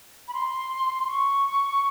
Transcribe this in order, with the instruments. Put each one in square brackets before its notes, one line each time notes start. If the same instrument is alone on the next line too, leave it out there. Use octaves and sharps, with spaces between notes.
[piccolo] B5
C6
C#6